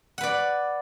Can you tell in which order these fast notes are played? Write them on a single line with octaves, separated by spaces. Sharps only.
F#5 B4 D5